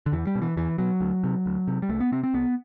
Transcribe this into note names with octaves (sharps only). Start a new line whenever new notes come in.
D3
E2 E3
G3
B2
E3
E2 E3
B2 F#3
D2
C3
D2
C3
G3
C2 A3
B3
C3 C4
C4
C2 B3